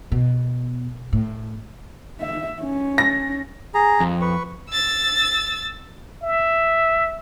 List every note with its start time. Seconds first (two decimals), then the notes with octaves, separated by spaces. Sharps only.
0.12 B2
1.13 A2
2.21 E5
2.62 C#4
2.98 A#6
3.74 G#4 A#5
4.00 F2
4.21 B4 C#6
4.70 E6 A6
6.23 E5